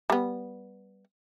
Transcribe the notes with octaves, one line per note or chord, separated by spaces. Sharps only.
G3 B3